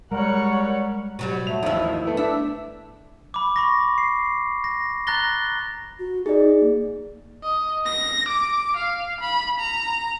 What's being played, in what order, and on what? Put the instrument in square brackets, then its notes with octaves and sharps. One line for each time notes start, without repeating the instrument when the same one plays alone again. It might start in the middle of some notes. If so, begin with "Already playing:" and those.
[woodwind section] G3 [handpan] G#3 [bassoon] A#4 [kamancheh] C#5 F#5
[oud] B2 F#3 G3
[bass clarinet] A3 [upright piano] F7
[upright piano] A1 D#2 F3 [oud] D#3 E4
[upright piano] A3 B3 E4
[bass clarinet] D4 [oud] E5
[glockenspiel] B5 D6
B5 C#6 A#6
C7
A#6
A#5 F#6 A6 A#6 G7
[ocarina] F#4
[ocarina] D#4 [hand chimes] G#4 D5
[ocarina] A#3
[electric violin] D#5
A#6
D6
F5
B5
A#5